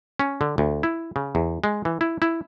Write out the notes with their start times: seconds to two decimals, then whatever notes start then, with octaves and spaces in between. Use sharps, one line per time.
0.20 C#4
0.41 D3
0.58 D2
0.83 E4
1.16 C#3
1.35 E2
1.64 G#3
1.85 E3
2.01 E4
2.22 E4